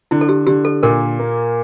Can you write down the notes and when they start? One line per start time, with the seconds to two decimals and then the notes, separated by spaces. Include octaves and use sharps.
0.11 D3 E4
0.21 A4
0.29 G4
0.47 D3 G4
0.65 A4
0.83 A#2 A#4
1.19 A#3